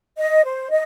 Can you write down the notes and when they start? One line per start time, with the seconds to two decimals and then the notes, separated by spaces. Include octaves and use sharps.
0.18 D#5
0.44 C5
0.70 D#5